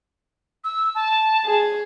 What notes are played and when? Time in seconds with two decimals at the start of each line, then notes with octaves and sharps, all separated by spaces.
0.64 E6
0.95 A5
1.45 G#4